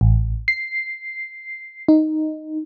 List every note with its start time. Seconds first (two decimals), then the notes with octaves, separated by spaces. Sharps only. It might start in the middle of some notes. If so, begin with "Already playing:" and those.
0.01 A1
0.48 C7
1.88 D#4